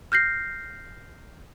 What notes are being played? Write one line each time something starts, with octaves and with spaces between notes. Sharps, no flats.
F6 G6 A#6 C7